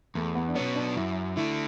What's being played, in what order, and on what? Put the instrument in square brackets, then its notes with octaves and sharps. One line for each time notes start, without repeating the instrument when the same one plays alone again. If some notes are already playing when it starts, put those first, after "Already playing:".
[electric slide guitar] E2 [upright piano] A3
[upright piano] B3
D4
[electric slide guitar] B2 F#3 B3 [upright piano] C#4
[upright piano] D4
[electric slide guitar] F#2 [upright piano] E4
[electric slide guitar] D3 A3 [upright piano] E4